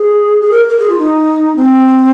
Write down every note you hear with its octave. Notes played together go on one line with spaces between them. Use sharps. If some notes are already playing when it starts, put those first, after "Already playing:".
Already playing: G#4
G#4
A#4
A#4
G#4
F4
D#4
C4